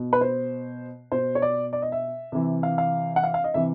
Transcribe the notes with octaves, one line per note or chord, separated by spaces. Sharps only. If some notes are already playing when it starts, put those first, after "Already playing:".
Already playing: B2
B4
C5
B2 C5
C#5
D5
D5
D#5
E5
C3 E3
F5
F5
F#5
F5
F5
D#5
C3 E3 E5